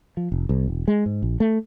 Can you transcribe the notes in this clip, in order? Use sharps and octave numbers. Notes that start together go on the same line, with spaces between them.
F3
F1
C2
E1
G#3
G#2
A#1
A3